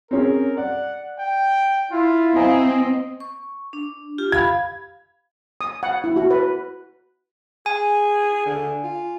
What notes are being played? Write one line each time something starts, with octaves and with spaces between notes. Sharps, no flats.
C4 C#4 G#4 A#4
D5 F#5
G5
E4 F4
C4 D#5 F5 G#5 A#5
C#6
D4
F4 G4
F5 B5 G#6
D#6
F#5
E4
F#4
B4
G#4 G#5
D3
F4